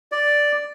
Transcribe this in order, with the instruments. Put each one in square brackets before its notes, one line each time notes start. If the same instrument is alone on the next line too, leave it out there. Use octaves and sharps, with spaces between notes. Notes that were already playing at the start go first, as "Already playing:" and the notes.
[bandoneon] D5